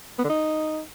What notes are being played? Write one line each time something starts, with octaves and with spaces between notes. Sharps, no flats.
B3
D3
D#4